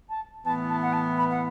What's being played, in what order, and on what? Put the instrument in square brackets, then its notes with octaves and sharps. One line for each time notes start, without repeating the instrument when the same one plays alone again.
[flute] A5
[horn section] A2 E3 B3 [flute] A5
[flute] A5
F#5
A5
B5
F#5